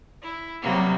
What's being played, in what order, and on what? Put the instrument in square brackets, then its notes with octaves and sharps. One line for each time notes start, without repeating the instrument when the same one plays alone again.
[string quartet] E4
C3 F#3 G3 A#3 B3